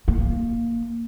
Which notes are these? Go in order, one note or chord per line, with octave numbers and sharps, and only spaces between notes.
A#3